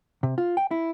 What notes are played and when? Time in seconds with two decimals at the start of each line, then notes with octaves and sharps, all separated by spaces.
0.23 C3
0.38 F4
0.57 G5
0.71 E4